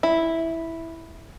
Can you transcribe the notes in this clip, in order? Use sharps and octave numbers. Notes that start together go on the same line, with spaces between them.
E4